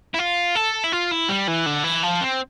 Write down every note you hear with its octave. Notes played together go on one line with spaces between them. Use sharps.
E4
F4
A4
E4
F4
E4
G3
E3
D3
E3
F3
C4